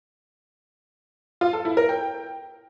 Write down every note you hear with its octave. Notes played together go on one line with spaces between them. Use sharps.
F4
A4
E4
A#4
G5